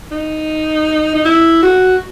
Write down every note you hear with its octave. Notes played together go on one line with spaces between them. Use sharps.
D#4
D#4
E4
F#4